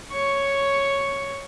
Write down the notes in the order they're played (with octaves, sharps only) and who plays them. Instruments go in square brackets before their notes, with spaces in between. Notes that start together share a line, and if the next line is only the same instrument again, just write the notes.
[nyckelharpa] C#5 C#6